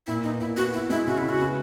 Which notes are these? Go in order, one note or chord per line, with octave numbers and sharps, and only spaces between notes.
A#2 E4
B3 D#4
A#2 E4
B3 F#4
E4 F#4
G#3 E4
C#3 F#4
E4
C#3
F#4
B3